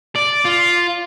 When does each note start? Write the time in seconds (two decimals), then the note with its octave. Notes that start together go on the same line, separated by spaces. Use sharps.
0.16 D5
0.45 F4